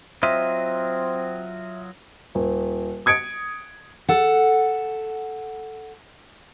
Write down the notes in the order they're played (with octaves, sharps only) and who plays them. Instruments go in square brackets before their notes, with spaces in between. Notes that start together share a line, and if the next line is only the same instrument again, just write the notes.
[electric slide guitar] F#3 F4 D#5 [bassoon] C4 [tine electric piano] E5
[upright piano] D#1
D#6 G#6 C#7 D7
[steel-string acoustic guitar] A4 F#5